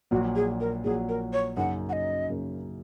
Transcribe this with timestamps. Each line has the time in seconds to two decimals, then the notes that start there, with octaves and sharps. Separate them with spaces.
0.11 A#1 A#2 F#3 F#4
0.36 G#4
0.60 A#4
0.84 A#1 A#2 F#3 G#4
1.09 A#4
1.33 C#5
1.57 F#2 C#3 A#3 D#4 F#5
1.89 F#5
1.93 D#5
2.30 F#2 C#3 A#3 D#4